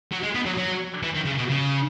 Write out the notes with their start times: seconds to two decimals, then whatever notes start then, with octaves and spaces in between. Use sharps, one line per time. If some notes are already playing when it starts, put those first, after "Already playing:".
0.12 F#3
0.23 G#3
0.35 B3
0.46 F#3
0.58 F#3
1.03 E3
1.15 D#3
1.26 C#3
1.38 B2
1.50 C#3